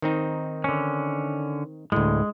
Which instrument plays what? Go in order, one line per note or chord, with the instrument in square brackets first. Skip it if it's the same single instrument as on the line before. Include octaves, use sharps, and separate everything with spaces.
[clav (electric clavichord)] D#3 C4 D#4
[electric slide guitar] D3 C#4
[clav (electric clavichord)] D2 A2 [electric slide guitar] G#3